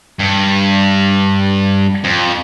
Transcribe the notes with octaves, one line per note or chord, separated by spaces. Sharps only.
G2
F2